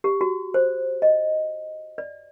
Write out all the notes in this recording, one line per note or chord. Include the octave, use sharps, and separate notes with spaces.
G4
F#4
C5
D#5
D5